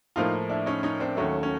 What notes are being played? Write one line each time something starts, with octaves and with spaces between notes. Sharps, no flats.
A2 F3 A#3 D#4 F4
D4 E4
C#4 D#4
C#4 D#4
C4 D4
D#2 D#3 F#3 A3 C#4
C#4